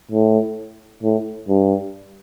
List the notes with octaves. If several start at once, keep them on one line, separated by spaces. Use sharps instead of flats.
A2
A2
G2